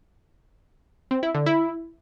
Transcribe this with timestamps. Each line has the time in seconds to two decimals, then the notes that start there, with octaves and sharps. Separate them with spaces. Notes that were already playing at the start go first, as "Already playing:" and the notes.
1.11 C4
1.23 E4
1.35 D3
1.46 E4